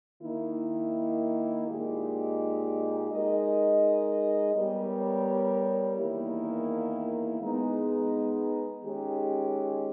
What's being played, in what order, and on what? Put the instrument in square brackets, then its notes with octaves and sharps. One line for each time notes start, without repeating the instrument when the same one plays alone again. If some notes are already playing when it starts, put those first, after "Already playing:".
[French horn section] D#3 A#3 E4
A#2 G#3 D#4 G4
G#3 D#4 A#4 D#5
G3 B3 G4 A#4 C#5
E2 D#3 A#3 E4
G#3 B3 D#4
D#3 G#3 C#4 G4